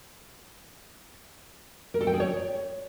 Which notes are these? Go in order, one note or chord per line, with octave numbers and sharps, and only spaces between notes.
A#4
A4
G5
G#4
C#5